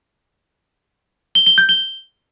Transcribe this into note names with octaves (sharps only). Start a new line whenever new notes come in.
G7
G7
G6
G7